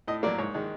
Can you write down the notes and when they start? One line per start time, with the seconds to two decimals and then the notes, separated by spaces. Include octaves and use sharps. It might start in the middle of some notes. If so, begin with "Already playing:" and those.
0.08 A2 D#5
0.23 F#3 A#3 D5
0.38 G#2 C#5
0.54 D#3 G#3